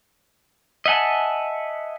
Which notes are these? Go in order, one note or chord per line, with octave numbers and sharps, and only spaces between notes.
D#5 E5 F#5 G#5 A5